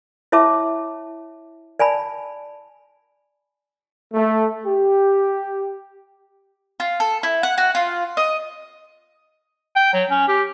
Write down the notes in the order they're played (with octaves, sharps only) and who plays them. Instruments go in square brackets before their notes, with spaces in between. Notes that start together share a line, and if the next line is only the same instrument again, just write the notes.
[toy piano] E4 C#5 E5 A5 D6
D5 G#5 A5 B5
[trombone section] A3
G4
[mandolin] F4
A4
E4
F#5
F#4
F4
D#5
[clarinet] G5
F#3
C#4
G4